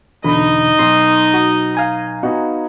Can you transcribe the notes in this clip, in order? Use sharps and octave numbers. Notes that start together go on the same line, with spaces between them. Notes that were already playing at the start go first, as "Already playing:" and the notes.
E2 B2 D3 D#4 D#5 B5
B1 B2 C6
F#4
F5 G#5 A#5
B3 D#4 F#4